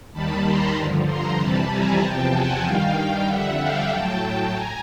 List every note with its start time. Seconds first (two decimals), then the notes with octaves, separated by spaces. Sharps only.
0.13 D#2 D#3 G3 A5 B5
0.44 A#5 C6
0.75 G2 D3 F3
1.07 A#5 C6
1.38 F2 C3 E3 G3 A5 B5
1.69 G#5 A#5
2.01 E2 C3 F3 G5 A5
2.33 F#5 G#5
2.64 G2 D#3 G3 F5 G5
3.27 F2 D3 G3 E5 F#5
3.58 F5 G5
3.89 A2 F#3 G5 A5
4.21 G5 A5
4.52 G#5 A#5